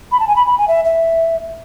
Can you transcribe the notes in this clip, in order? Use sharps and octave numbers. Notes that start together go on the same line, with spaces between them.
B5
A5
G#5
B5
B5
G#5
E5
E5